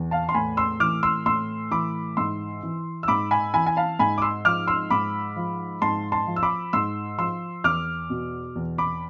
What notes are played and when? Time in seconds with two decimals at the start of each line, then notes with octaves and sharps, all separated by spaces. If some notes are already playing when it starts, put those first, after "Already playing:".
Already playing: E2
0.11 F5 A5
0.29 C6
0.34 A2 G#5 B5
0.57 C6 E6
0.80 E3 D6 F6
1.03 C6 E6
1.26 A2 C6 E6
1.71 E3 B5 D6
2.17 G#2 C6 E6
2.63 E3
3.03 E6
3.08 G#2 B5 D6
3.31 G#5 B5
3.54 E3 G#5 B5
3.66 G#5
3.77 F5 A5
3.99 G#2 G#5 B5
4.18 D6
4.22 C6 E6
4.45 F3 D6 F6
4.67 C6 E6
4.90 G#2 B5 D6
5.36 F3
5.82 G#2 A5 C6
6.12 A5 C6
6.27 F3
6.36 E6
6.43 B5 D6
6.73 G#2 C6 E6
7.18 F3 C6 E6
7.64 E2 D6 F6
8.10 B2
8.56 E2
8.78 B5 D6